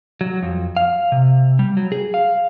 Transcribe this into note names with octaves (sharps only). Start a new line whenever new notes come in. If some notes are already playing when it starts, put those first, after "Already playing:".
F#3
F2
F5
C3
G3
F#3
G#4
F5